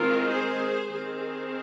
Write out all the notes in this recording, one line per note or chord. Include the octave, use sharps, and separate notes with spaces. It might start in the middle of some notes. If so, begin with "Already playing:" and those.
Already playing: D#3 G#3 C4 F4 A#4
G#4 C5
D#3 C4 G#4 C5